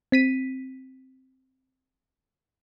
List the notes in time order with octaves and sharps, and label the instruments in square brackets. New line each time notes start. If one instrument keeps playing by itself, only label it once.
[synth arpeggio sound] C4 B6 D#7